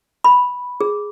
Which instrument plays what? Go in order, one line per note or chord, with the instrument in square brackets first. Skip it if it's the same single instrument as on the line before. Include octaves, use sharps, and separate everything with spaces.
[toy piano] B5
G#4